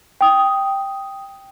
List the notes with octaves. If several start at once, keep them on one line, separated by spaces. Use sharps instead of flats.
G5 D#6